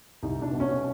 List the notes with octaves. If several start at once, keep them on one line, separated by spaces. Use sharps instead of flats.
C2 D#4
D4
B2
C#4